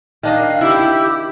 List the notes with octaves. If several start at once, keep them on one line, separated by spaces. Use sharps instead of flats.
D#3 D4 D#5 F5
E4 G4